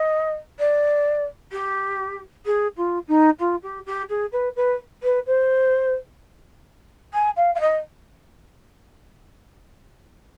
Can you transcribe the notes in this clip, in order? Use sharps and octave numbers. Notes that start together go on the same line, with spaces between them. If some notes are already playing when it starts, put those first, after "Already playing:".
Already playing: D#5
D5
G4
G#4
F4
D#4
F4
G4
G4
G#4
B4
B4
B4
C5
G#5
F5
F5
D#5